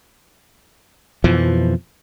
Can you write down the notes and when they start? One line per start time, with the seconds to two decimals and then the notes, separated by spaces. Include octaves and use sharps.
1.24 F2 B2 E3 F3